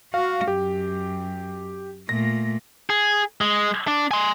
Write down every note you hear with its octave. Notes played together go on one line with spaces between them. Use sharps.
F#4 F5
F#2 G4
A#2 A3 A#6
G#4
G#3
D4
G#5 C6